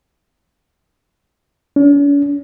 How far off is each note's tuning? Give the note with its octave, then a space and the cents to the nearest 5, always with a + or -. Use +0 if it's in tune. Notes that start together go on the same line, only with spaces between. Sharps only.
C#4 +45